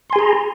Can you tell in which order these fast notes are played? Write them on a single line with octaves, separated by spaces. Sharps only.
C6 G#5 G#4 A#5